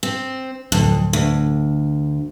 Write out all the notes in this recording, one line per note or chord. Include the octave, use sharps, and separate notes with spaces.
C4
D1 F2
D2